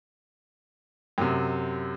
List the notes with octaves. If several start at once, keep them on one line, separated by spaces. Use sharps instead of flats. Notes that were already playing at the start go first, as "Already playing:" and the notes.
F#2 C3